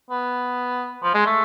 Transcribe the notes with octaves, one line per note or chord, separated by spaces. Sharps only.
B3
F3
G#3
A3